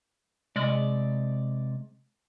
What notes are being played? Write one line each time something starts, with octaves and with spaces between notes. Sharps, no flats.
C3 G#3 D5